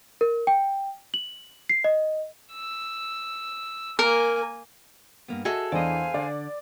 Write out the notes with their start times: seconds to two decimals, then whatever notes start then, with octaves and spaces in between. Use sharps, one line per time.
0.21 A#4
0.47 G5
1.14 F#7
1.69 C7
1.84 D#5
2.53 E6
3.99 A#3 A#4 G#5
5.28 G2 A#3 B3
5.45 F#4 G#4 A4 D#5 E5
5.72 E2 E3 D4 C5 D5 D#5 F5 G#5
6.14 D3 D5